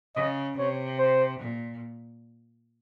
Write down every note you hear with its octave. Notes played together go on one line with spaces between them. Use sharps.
C#3 D#5
C3 C#5
C5
A#2